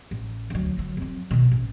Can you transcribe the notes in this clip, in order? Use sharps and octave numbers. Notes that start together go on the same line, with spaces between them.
A1
D2 F#3
D3 F#3
F2 F#3
B2 D#3
A1